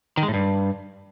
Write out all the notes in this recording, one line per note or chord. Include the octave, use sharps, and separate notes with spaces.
D#3
G#3
A2
G2